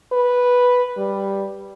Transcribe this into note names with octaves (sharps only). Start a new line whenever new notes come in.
B4
G3